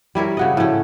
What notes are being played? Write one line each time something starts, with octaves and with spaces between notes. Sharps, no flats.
G3 E4 A#4 C#5
C#3 F#4 D#5
A2 C#4